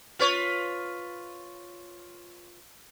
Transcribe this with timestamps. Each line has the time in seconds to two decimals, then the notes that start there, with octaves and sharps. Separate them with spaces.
0.19 F4 B4 C#5